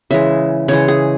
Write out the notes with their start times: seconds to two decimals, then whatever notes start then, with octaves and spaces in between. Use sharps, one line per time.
0.11 C#3 E3 G#3 E5
0.68 C#3 E3 G#3 C#5
0.88 G#4